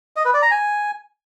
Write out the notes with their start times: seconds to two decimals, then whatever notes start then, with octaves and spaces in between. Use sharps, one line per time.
0.16 D#5
0.25 B4
0.34 D5
0.42 A#5
0.51 G#5